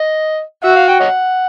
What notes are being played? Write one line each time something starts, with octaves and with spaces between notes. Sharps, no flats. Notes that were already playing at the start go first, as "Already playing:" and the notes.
Already playing: D#5
F#4 E5
F5
G5
C#5 D#5 F#5